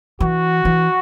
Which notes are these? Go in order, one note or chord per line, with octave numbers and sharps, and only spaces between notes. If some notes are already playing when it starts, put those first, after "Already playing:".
E3 F#4
E3